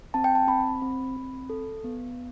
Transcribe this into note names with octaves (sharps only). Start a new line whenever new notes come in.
C4 A5
G5
A5
C4 B5
C4
C4
A4
B3